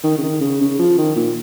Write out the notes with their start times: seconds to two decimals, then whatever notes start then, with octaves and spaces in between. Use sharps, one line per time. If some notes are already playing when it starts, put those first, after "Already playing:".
0.04 D#3
0.18 C#3
0.23 D#3
0.41 C#3
0.61 C#3
0.79 F3
0.98 D#3
1.16 A#2